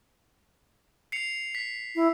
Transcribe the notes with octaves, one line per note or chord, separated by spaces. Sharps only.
C7 C#7 F7
B6
E4